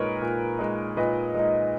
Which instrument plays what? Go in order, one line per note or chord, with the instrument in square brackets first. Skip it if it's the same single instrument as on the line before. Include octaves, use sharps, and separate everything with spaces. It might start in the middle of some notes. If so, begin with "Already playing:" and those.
Already playing: [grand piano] A#2 G#3 D#4 A#4 B4 C#5
A#2
G#3 D#4
A#2 B4 D#5
G#3 D#4